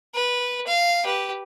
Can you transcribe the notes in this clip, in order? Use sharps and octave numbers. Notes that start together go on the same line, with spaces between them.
B4
F5
G4 B4